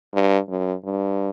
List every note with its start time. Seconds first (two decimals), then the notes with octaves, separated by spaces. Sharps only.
0.14 G2
0.49 F#2
0.84 G2